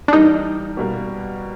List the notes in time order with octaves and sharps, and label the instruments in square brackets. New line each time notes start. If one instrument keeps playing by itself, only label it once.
[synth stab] D4
[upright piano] E3 G3 A#3 [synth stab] D#4
[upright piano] B2 G3 A#3